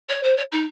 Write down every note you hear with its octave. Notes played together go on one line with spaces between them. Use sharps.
C#5
C5
C#5
D#4